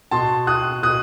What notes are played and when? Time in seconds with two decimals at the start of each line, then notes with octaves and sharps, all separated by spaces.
0.11 B2 A5 C6
0.47 D#6 F#6
0.83 B2 D#6 F#6